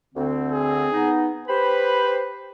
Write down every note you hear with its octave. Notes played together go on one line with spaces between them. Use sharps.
D2 D3 C4
G#4
B3 D#4
G4 B4 C5 B5